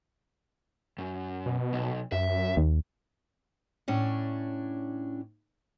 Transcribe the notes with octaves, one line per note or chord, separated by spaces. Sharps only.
F#2
B2
B1
F#2 E5
D#2
A2 C#4 D4